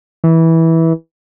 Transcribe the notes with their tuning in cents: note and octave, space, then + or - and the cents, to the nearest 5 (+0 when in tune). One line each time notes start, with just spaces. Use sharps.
E3 -15